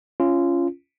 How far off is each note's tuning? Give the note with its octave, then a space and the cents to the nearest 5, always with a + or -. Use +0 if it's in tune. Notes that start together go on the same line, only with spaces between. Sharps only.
C#4 +0 F4 -20